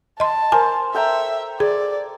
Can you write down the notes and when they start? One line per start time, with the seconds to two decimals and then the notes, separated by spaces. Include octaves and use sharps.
0.20 D#5 A5 C6
0.52 A#4 C5 G#5
0.94 A4 E5 G5 A#5
1.60 G#4 D5